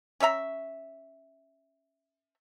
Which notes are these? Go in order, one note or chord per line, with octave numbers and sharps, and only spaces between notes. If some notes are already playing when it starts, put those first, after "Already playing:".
C#4 C#5 E5 A#5